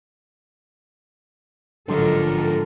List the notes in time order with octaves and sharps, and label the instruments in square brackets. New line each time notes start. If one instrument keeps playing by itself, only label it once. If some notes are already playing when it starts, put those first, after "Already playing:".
[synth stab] A1 F#3 D#5 [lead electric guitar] G#2 F3 [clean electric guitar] D3 [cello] A4 A#4